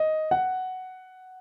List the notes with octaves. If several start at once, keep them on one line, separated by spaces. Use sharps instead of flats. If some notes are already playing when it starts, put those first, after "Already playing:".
Already playing: D#5
F#5